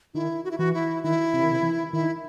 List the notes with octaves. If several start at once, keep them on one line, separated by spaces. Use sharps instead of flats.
D#3 E4
F#4
E4
E3 F#4
E4
D#3 E4
C3
D#3
C3
E3
D#3 E4